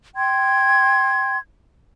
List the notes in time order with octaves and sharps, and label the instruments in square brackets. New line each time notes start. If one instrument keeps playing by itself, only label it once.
[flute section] G5 C6 G#6